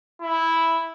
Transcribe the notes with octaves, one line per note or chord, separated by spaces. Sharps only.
E4